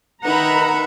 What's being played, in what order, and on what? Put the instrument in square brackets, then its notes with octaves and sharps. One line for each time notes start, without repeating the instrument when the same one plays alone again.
[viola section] D#3 A#5 [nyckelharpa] D#4 B4 [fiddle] E5 B5 [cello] F#5